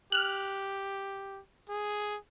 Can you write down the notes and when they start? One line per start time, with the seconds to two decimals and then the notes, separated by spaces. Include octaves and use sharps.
0.12 G4 F6 F#6
1.69 G#4